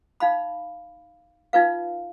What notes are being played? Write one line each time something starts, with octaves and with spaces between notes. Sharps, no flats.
D#4 F5 B5
D#4 F4 B4 F5